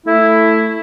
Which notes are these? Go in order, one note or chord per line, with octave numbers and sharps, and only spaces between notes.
A3 E4